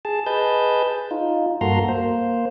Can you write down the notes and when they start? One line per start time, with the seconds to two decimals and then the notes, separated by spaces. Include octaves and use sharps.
0.05 G#4 A5
0.26 G#4 B4 D#5 A5 G6
1.11 D#4 F4
1.61 G2 A#3 F#4 A4 A#5 C6
1.88 A#3 C5